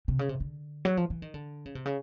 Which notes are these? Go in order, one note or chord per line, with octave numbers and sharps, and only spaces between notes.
C3
C#3
C3
D3
F#3
F3
E3
D#3
D3
C#3
C3
C#3